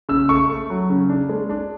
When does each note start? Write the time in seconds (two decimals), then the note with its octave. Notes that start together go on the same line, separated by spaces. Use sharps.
0.09 C#3 E6
0.29 A3 C#6
0.49 A3
0.70 F#3
0.90 C#3
1.09 D4
1.29 G#3
1.49 D4